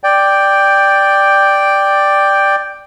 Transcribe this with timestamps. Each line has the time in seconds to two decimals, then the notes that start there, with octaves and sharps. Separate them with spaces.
0.04 D5 G5